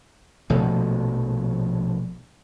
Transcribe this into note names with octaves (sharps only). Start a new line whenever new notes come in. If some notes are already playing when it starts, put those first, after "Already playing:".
A#1 B2 F3 A3